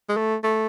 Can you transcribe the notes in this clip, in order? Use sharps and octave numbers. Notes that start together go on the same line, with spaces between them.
G#3
A3
A3